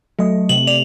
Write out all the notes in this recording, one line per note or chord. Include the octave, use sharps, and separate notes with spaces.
F#3 A3 D#5
C3 F#7
D5 F7